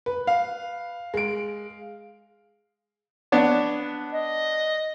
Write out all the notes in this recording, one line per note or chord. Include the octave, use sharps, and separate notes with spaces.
B4
F5
G#3 D7
B3 D4 C#5
D#5